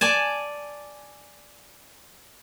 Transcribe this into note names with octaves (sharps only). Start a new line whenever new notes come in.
D5 G#5 A5